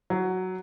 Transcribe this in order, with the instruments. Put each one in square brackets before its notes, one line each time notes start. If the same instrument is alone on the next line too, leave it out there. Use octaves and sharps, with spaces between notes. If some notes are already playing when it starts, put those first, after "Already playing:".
[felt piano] F#3